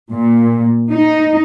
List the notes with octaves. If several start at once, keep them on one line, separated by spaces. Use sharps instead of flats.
A#2
D#4